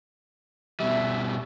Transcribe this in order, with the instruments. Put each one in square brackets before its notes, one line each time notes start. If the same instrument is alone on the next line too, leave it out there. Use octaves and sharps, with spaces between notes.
[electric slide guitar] B2 G3 [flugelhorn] E5